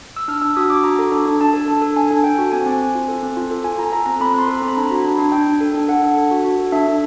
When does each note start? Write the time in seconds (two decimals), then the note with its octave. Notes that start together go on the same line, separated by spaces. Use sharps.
0.16 E6
0.28 D4 F6
0.41 D4 E6
0.57 F#4 D#6
0.70 D4 D6
0.84 F#4 A#5
0.99 A4
1.12 D4
1.26 D4
1.41 D4 A5
1.54 A4
1.68 D4
1.82 A4
1.96 D4 G#5
2.11 D4
2.24 A4 G5
2.38 F#4
2.52 C4 G#5
2.66 C4
2.81 C4
2.95 F4
3.08 A4
3.22 C4
3.37 F4
3.51 A4
3.64 F4 G#5
3.78 F4 A#5
3.92 A4 A#5
4.06 C4 A#5
4.20 C4 B5
4.34 C4 C6
4.48 A4
4.58 C4 A#5
4.68 B5
4.77 D4 A#5
4.91 F#4
5.04 D4
5.18 D4
5.32 D4 G5
5.46 D4
5.61 A4
5.74 D4
5.88 A4 F#5
6.02 D4
6.17 D4
6.31 F#4
6.45 F#4
6.59 A4
6.72 D4 E5
6.87 D4